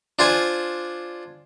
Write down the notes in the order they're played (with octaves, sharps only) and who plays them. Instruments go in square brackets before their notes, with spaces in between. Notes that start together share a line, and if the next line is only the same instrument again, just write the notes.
[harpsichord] D4 F4 C5 G#5